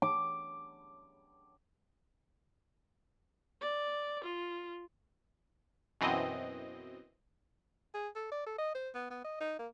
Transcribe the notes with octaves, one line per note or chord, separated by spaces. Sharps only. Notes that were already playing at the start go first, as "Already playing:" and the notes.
D6
D5
F4
F#2 B2 E3 C4 D#5
G#4
A4
D5
A4
D#5
C5
B3
B3
D#5
D#4
A#3